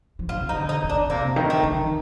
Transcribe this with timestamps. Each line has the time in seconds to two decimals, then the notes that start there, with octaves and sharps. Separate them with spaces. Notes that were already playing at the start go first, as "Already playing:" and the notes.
0.19 F3
0.29 D#3 F4
0.49 D#4
0.57 D3
0.69 D#4
0.84 D3
0.90 D4
1.10 C3 A#3
1.36 D#3
1.50 A3
1.63 D#3